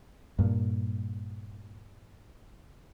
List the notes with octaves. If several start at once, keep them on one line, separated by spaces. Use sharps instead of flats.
G2 A#2